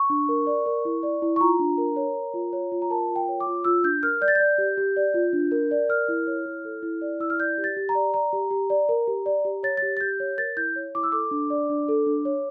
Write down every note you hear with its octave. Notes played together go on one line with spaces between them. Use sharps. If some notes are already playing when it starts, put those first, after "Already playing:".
Already playing: C#6
D4
A#4
D5
A#4
E4
D5
E4
C#6
F4 A#5
D4
A#4
C#5
A#4
F4
C#5
F4
A#5
A#4 A5
F4
G5
C#5
D6
F4
F4 E6
D4 G6
A#4 F6
D5 G6
A6
D5 G6
G4
G4
D5
F4
D4
A#4
D5
A#4 F6
E4
C#5
E4
A4
E4
D5
E4 E6
F6
D5 G6
G4
A6
G4
A#5
D5
D5 A#5
G4
G4
D5
A#4
G4
D5
G4
C#5 A6
G4 A6
A6
G4 G6
C#5
A#4 A6
E4 G6
C#5
E4 D6
E6
A4 D6
D4
D5
D4
A4
D4
C#5